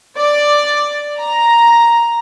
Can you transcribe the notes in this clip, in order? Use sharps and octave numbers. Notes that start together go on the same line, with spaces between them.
D5
A#5